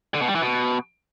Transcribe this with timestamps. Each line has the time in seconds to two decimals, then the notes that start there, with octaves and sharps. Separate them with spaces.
0.15 D3
0.21 B2
0.28 G3
0.35 E3
0.42 B2